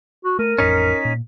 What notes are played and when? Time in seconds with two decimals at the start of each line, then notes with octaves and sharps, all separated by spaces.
0.25 F#4
0.39 A3 A#4 D#7
0.59 A1 F2 C#4 D#4 B6
1.05 A#2